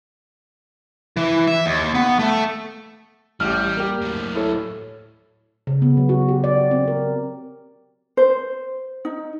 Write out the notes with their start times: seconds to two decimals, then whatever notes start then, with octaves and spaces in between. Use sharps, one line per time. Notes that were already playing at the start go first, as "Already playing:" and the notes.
1.17 E3
1.48 E5
1.66 D#2
1.94 B3
2.19 A3
3.40 A1 G3 G4 F6
3.77 A#3 G4
4.02 A2 F#3
4.35 E4 A4 C#5
5.67 C#3
5.82 B3
5.97 F#3
6.09 F#4
6.28 G4
6.44 D5
6.71 C4
6.88 A#4
8.17 C5
9.05 D#4